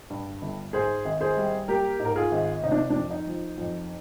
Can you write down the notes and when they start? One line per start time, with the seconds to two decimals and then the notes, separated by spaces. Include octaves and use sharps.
0.10 G2
0.42 G1
0.73 G#2 G#4 C5
1.05 G#1
1.21 G#4 C5
1.37 G3
1.68 A#3 G4 A#4
2.00 G#2
2.05 A#4
2.16 F4 G#4
2.32 G#1
2.62 C3 D#4
2.72 D4
2.90 F2 D4
3.11 D#4
3.26 F3
3.58 F2